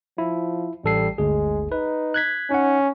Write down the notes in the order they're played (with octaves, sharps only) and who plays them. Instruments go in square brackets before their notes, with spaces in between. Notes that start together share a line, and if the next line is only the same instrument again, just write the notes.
[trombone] F3 [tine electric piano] E4
[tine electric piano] A1 A4 C7 [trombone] G3
[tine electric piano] G1 D2 G#4 [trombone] G#3
[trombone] D#4 [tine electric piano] B4
[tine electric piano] F#6 G#6 B6
[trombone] C#4 [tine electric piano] D#4 F#5